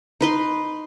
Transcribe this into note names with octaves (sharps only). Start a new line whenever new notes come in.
D#4 B4 C6